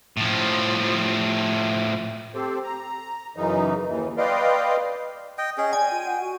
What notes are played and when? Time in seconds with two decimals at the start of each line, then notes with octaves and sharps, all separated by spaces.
0.17 A2 F3
2.35 C4 G4 A4 C5
2.63 A#5
3.36 F#2 C#3 E3 D#4
3.88 D#2 E3
4.18 B4 D5 D#5 F5 G5 C6
5.38 D#5 G5
5.58 C#4 G#4 D#5
5.73 D5 G5 G#5
5.91 F4
6.06 F#5
6.21 F#4